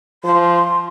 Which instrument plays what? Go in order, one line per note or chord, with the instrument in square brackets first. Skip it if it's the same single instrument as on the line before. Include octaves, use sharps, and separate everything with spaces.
[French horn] F3 [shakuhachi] C6